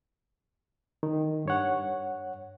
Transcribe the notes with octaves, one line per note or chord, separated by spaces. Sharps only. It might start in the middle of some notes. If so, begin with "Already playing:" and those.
D#3
G2 C#5 F#5